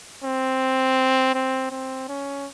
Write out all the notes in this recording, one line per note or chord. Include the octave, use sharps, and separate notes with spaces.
C4
C4
C4
C#4